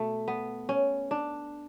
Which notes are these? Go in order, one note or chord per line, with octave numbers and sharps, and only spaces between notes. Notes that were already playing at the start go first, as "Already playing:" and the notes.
Already playing: B2 A3
B3
C#4
D4